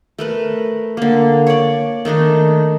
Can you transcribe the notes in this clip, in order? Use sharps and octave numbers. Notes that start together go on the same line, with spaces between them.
A3 A#4 B4
D3 A#3
C#5 D5
D#3 A3 D4 D#4